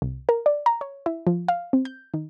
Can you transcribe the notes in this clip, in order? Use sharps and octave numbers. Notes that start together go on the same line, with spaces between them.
C2
A#4
D5
A#5
C#5
E4
F3
F5
C4
G6
D#3